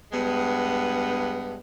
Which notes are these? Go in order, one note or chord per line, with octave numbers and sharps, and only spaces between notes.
G2 G#3 B3